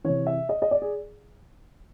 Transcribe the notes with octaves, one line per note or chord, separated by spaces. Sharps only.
C3 E3 C#5
E5
D#5
D#5
D5
G#4